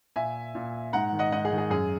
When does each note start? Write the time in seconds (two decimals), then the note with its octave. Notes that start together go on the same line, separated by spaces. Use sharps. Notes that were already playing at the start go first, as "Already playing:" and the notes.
0.16 A#2 E5 G#5
0.55 A#2
0.93 G#2 F#5 A#5
1.13 D#3
1.19 D#5 F#5
1.32 G#2 D#5 F#5
1.45 G#4
1.51 D#3
1.58 G#4
1.70 F#2 G#4